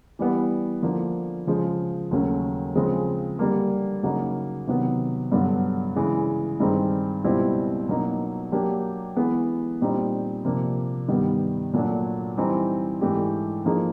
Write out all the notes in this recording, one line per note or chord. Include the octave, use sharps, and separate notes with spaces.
E3 G3 B3
D3 F3 A#3
C#3 F3 G#3
D#2 C#3 F#3 A3 C#4
C#3 F3 G#3 C4
D3 G3 A#3
C#3 F#3 A#3 D#4 F#4
C3 D#3 F#3 B3
G2 D3 F#3 B3
C#3 E3 G#3
G2 D#3 G#3 C4 D#4
C#2 B2 G3 C4 E4
B2 F#3 A#3 D#4
F#3 A#3 D4 G4
E3 G#3 B3
A#2 G3 C4 D#4
C3 F3 A#3 D4
G2 D#3 G3 B3
A#2 F#3 A3 D4
E3 G3 C4 D#4
G#2 E3 A3 D4 G4
F3 A#3 D#4 G#4